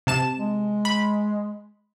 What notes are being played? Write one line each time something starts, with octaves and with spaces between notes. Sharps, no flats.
C3 A5 E7
G#3
B5